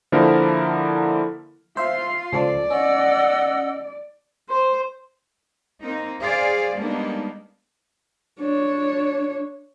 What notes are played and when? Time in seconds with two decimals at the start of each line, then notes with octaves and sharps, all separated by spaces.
0.12 D3 F3 A#3 E4 A4 A#4
1.77 F4 C5 E5 F5 C6
2.33 C#2 F3 A4 D5
2.70 C#4 D#5 F#5 E6
4.49 C5
5.82 A#3 C4 D#4
6.21 G#4 C5 D5 F5
6.75 G3 G#3 A#3 B3 D4 D#4
8.40 D4 C#5